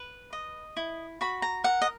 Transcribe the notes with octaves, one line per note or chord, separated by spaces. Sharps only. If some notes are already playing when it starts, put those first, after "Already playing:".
Already playing: B4
D#5
E4
F#4 B5
A#5
A#4 F#5
D#5